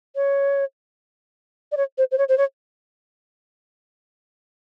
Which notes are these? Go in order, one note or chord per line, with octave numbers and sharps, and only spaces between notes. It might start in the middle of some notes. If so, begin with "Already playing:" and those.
C#5
D5
C#5
C5
C5
C#5
C5
C#5